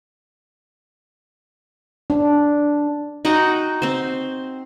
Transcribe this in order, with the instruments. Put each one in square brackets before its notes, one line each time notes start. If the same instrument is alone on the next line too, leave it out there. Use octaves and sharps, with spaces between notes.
[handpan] D4
[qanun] D#4 F#4 F#5 G5
C4 C5